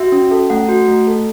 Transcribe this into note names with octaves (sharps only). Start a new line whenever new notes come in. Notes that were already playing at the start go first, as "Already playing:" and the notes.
Already playing: F#4 E5
C#4
A4
A3 F#5
F#4
A3
A4